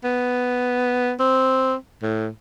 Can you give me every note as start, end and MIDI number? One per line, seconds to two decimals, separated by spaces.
0.04 1.13 59
1.20 1.75 60
2.02 2.28 45